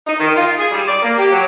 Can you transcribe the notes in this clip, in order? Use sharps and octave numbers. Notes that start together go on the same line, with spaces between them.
D#4
D#3
F4
G#4
G3
D5
A#3
G4
F#3